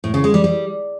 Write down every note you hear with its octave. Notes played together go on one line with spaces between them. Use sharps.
A2
C#3
G#3
G3
G3